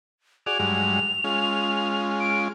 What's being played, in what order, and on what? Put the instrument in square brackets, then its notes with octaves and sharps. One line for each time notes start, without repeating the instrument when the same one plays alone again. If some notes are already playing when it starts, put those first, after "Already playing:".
[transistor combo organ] F#4 G#4 D5 [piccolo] F7
[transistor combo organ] G2 F#3 G#3
G#3 C#4 F4
[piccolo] D7